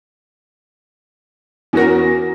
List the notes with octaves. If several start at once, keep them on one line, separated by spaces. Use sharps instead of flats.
E2 C#4 F#4 A#4 A#6